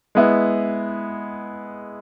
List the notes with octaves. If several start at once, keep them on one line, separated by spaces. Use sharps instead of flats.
G#3 B3 E4